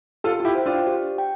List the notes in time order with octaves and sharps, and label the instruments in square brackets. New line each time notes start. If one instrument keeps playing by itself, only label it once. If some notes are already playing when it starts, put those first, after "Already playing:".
[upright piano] F4 A4 [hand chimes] G4
[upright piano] F4
E4 G4
[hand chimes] C5 G5
[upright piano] D4 F4
[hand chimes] G4
G5